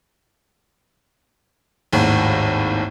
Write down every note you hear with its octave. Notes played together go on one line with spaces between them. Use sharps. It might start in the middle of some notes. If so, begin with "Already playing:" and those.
G#1 D#2 A2